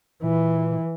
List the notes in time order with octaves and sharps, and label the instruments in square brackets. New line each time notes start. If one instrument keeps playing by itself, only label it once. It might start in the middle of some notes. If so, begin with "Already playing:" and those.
[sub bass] A#2 [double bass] E3